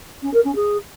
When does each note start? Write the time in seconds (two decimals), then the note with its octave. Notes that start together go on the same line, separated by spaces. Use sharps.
0.22 C#4
0.33 A#4
0.44 C#4
0.55 G#4